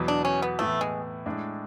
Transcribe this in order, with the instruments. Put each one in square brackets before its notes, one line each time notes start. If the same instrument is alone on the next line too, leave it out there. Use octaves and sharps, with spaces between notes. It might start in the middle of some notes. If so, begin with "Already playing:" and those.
Already playing: [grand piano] E2 B2 F#3 B3
[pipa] D4
C#4
B3
[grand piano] A2 E3 B3 E4 [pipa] A3
[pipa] G#3
[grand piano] A2 G#3 D4